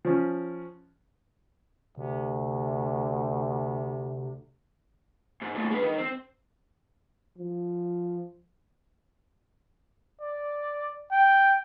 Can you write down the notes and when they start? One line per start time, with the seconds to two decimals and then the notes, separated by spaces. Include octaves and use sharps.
0.05 F3 C#4
1.97 D2 C3
5.42 G#2
5.54 D#2 A2
5.71 G#3 B4
5.83 D#3
5.98 C4
7.38 F3
10.21 D5
11.12 G5